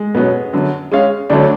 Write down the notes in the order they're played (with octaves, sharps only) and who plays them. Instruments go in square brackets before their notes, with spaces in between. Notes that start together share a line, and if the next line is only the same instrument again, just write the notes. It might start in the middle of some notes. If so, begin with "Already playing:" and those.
Already playing: [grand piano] G#3
[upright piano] B2 F#3 C#4 [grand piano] B3
[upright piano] F#2 D3 F#3 B3
G#3 C#4 G#4 C#5 F5
[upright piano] D2 D3 F#3 A3 C#4 [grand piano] D4